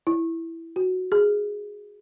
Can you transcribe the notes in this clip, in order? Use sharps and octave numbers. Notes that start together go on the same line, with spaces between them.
E4
F#4
G#4